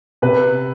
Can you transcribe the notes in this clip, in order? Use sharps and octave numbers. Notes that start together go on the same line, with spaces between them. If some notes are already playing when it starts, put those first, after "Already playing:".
C3 B4